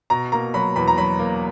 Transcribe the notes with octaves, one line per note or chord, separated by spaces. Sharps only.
B2 A#5
A#3 A#5
F#3 B5
E2 B5
A#5
F#3 B5
A#3